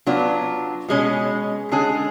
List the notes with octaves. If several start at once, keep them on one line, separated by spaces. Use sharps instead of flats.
F#3 B3 D4 F4
B2 G#3 C#4
D3 G#3 C#4 G#4